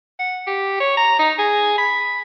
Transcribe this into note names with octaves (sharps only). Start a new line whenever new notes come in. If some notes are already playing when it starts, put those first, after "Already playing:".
F#5
G4
C#5
A#5
D#4
G#4
B5